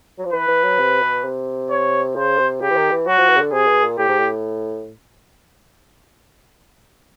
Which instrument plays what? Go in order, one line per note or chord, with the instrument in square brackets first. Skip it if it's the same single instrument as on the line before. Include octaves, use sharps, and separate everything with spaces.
[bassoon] F#3
F3
[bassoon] E3 [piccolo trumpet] B4
[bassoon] E3
F#3
C3
B2
C3
[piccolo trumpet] C#5
[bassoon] C#3 [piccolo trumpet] C5
[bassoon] C3
[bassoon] C#3 [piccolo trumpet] G4
[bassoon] E3
D#3
E3
[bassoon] F#3 [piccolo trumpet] F#4
[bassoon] F3
E3
C#3
D3
[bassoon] C3 [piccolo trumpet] G#4
[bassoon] B2
A#2
[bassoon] A2 [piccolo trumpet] G4
[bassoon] G#2
A2